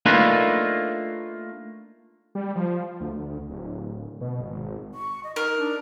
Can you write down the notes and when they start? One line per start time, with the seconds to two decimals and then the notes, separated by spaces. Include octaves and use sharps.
0.06 A3 A#3 D4 D#4 F4 B4
2.35 G3
2.55 F3
3.00 D2
3.50 D1
4.21 B2
4.41 G#1
4.95 C#6
5.24 D#5
5.36 D#4 A#4
5.57 D4